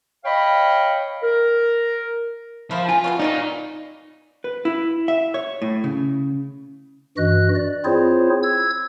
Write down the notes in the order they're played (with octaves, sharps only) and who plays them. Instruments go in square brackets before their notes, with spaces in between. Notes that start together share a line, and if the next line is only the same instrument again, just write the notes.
[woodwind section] C#5 D#5 F5 G5 B5
A#4
[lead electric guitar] F3 [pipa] E4 A#4 C5
[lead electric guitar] F4 [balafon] G#5
[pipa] C#3 B3 C#4
[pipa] D#3 F#3 G#3 [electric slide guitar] D#4 [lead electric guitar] F4 D5
[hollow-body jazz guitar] B4
E4
E5
C#5
A2
C#3
[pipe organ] G2 E3 F#4 D#5 F#6
D5
C4 E4 F4 G#4 C5 C#5
E6 G#6